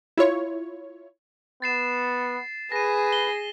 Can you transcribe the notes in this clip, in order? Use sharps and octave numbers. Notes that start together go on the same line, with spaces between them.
E4 F4 C#5
B3 A6 C7 E7
G#4 B4 A#6 D#7
G7